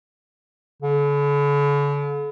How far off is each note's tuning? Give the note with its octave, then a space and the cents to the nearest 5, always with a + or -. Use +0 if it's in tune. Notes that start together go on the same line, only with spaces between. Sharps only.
D3 -45